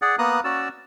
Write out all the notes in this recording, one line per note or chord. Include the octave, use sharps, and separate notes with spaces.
G#4 D5 F#5
A#3 B3 A#5 D#6 F#6
C#4 F#4 D5 E6